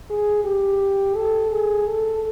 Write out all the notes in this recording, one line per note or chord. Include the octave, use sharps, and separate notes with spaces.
G#4
G4
A4
G#4
A4